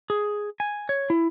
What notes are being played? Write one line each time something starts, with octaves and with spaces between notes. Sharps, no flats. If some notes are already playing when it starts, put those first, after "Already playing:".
G#4
G#5
C#5
E4